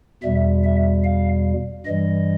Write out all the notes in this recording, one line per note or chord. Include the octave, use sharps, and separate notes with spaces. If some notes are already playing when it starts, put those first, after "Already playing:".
E2 B2 G3 E5
E5
F5
G2 E3 G3 D#5